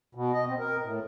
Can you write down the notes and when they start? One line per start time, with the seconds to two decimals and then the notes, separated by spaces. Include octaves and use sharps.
0.15 B2
0.32 D#5
0.47 C4
0.59 A#4
0.83 A2